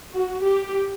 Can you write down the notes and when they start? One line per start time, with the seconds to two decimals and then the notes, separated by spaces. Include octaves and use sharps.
0.13 F#4
0.43 G4